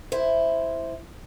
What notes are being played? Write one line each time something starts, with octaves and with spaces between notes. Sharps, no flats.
E4 C5